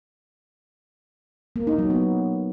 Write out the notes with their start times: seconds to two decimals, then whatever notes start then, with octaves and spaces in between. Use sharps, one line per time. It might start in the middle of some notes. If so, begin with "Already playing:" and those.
1.56 A#3
1.67 D#4
1.79 F#3
1.90 B3